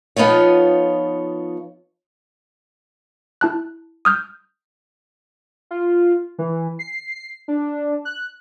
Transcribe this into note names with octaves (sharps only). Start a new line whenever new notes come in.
F3 B3 D#4 F4 C#5
E4 A5 F#6
D#6 F6 G6
F4
E3
C7
D4
F#6